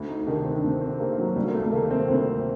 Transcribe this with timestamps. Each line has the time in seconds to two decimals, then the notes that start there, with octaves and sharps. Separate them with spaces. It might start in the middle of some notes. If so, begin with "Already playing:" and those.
Already playing: D2
0.08 D#4
0.26 C3 D#3 D4
0.44 C4
0.58 D4
0.63 D2 C4
0.81 C4
0.99 C3 D#3 A#3
1.18 F#3
1.36 D2 G3
1.47 A#3
1.54 A3
1.66 A3
1.72 D#3 A#3
1.76 C3
1.90 C4
2.08 D2 C4